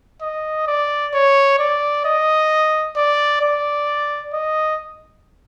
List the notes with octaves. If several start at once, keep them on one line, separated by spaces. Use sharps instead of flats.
D#5
D5
C#5
D5
D#5
D5
D5
D#5